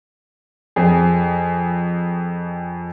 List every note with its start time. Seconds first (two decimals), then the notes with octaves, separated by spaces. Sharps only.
0.76 F2 G#4